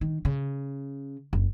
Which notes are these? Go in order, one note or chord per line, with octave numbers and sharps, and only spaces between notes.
D#3
C#3
F#1